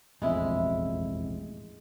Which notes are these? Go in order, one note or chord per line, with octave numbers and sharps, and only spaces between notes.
E1 A1 F2 G#3 E4